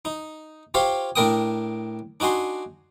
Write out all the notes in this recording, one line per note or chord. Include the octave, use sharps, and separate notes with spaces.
D#4
F4 G4 C5 C#5 F5
A2 D4 A#4 G5 D#6
D4 D#4 F#4 G#5 C6